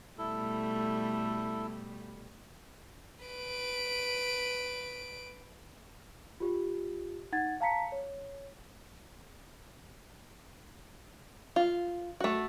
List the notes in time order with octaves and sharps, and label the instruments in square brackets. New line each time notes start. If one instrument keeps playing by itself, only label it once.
[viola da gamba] B2 G3 A3 [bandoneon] E4 A4
[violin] B4 D7
[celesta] F4 G4
D#4 F#5 G#6 A6
F5 A5 A#5 B6 C#7
C#5
[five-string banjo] F4
A3 F#4